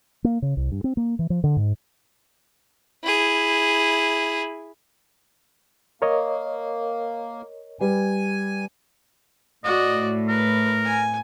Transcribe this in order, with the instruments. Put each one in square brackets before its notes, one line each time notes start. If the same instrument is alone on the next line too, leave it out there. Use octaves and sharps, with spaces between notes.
[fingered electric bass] A#3
C#3
C2
G2
C4
A#3
E3
F3
D3
G#2
[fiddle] E4 G#4
[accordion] A#3 [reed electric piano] A#4 C#5 D#5
[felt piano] G3 B4 [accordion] G#5
[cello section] A2 [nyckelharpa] F#4 D5 [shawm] D#5
[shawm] A#4 [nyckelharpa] B4
[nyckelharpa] G#5